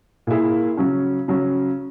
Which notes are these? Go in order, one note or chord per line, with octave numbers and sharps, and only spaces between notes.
A#2 A#3 E4 G#4
C#3 F#3 C#4
C#3 F#3 C#4